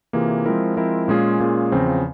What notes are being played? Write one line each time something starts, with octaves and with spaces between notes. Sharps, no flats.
C3 E3 A#3 F4 G#4
F3 G#3 C4 E4 A#4
F3 G#3 C4 E4 A#4
A#2 G#3 C#4 F4 G#4
A#2 G#3 C#4 F4 G#4
E2 C#3 F3 C4